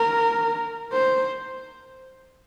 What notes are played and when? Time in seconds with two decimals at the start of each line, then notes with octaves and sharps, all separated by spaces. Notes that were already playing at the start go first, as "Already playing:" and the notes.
Already playing: A#4
0.93 C5